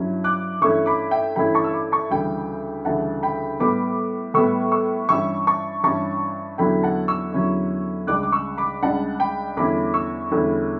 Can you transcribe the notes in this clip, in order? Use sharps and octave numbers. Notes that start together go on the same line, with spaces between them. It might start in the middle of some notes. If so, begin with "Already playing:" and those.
Already playing: G2 F#3 C#4 E4
D6 F#6
G2 E3 A3 C#4 E4 C#6 E6
B5 D6
E5 G5
G2 E3 A3 C#4 E4 G5 B5
A5 C#6
E6
B5 D6
A5 C#6
D2 C#3 E3 G3 E5 G5
D2 C#3 E3 G3 F#5 A5
G5 B5
A2 G3 B3 B5 D6
A2 G3 B3 C#6 E6
C#6 E6
G2 E3 G3 C#4 C#6 E6
A5 C#6
G2 E3 G3 C#4 A5 C#6
E2 D3 F#3 C#4 E4 G5 B5
F#5 A5
C#6 E6
E2 D3 F#3 C#4 E4
C#2 C#3 G3 D4 D6 F#6
D6
C#6 E6
B5 D6
C#2 C#3 G3 D4 F#5 A5
G5 B5
E2 D3 G3 C#4 E4 B5 D6
C#6 E6
E2 D3 G3 C#4 E4